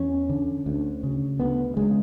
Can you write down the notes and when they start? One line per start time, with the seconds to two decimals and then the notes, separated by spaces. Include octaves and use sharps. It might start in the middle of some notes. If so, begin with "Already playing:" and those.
Already playing: E2 C#4
0.29 D3
0.66 D2
1.03 C#3
1.40 D2 B3
1.77 C#3 G#3